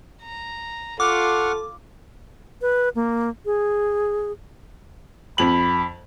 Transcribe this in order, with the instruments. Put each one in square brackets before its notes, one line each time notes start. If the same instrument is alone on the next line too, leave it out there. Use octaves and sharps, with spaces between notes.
[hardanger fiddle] A#5
[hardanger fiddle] F4 [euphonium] A4 [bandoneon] F#5 C#6 F6 [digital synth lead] D6
[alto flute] B4
A#3
G#4
[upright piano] F2 F#7 [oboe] B5